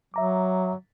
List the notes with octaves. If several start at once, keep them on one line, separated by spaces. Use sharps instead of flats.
F#3 E5 A#5 D6